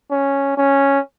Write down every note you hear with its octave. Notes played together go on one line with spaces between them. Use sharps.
C#4
C#4